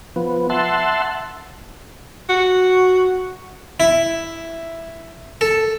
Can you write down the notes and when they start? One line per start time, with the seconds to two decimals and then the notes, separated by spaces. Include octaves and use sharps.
0.16 F3 B3
0.50 E5 F#5 A5 C6
2.29 F#4
3.80 E4
5.41 A4